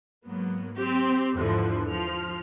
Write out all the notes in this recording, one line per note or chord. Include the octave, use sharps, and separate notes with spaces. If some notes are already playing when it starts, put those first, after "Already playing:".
G#2 F#3 A#3 B3
C4 G4
E2 G#2 D3 E3 F3
F3 F6